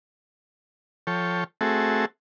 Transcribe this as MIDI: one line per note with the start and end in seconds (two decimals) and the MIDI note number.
1.07 1.44 53
1.07 1.44 69
1.07 1.44 73
1.07 1.44 79
1.61 2.05 57
1.61 2.05 60
1.61 2.05 66
1.61 2.05 68
1.61 2.05 69
1.61 2.05 76